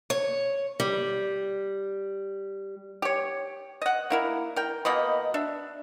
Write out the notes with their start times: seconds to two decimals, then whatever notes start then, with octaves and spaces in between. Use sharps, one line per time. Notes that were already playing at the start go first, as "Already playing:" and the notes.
0.10 C#5
0.80 G3
3.02 G4 C#5
3.82 D#5 F#5
4.10 A#3 E4 A#4
4.56 A#4 G5
4.85 B2 A#3 D#5 B5
5.34 D4 E5